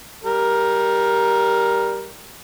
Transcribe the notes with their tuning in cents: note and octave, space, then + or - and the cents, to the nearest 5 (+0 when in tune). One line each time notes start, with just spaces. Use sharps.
G3 +0 A#4 +10